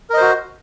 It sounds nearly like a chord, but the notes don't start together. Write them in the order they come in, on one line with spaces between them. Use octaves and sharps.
A#4 D#5 C5 F#4